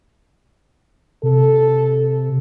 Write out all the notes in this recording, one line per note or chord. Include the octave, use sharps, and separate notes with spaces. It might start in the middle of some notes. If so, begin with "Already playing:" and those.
C3 A4